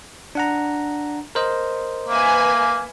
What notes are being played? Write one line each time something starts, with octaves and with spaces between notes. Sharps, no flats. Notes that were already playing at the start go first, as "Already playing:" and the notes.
D4 F#5 A#5
A#4 C5 D#5
A#3 B4 E5 G#5